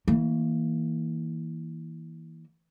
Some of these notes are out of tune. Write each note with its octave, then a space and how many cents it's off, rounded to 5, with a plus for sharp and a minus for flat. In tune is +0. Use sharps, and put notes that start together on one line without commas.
E3 -30 A#3 +0